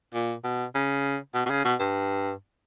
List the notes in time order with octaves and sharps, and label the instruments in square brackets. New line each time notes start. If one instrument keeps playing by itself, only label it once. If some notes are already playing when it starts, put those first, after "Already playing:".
[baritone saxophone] A#2
B2
C#3
B2
B2
C#3
B2
G2